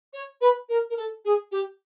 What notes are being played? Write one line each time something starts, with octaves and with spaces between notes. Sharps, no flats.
C#5
B4
A#4
A#4
A4
G#4
G4